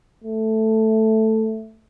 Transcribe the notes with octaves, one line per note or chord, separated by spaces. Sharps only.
A3